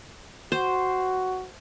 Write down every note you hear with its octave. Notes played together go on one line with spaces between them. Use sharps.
F#4 C5